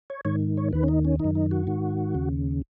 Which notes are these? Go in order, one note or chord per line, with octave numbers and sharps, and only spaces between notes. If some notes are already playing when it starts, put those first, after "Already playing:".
C#5
G#2 D#3 C#5
C#5
D#2 D#3 B4
C#4
D#4
C#4
F#2 D#3 D#4
D#4
F#4
G#2 D#3
D#2 C#3